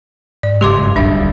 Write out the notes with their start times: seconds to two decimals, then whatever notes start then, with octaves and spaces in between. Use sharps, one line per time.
0.43 G#2 D5
0.61 F#1 C#3 G#3 G4 C6 D6
0.81 G2
0.96 D1 A#1 D#2 G3 D4 E5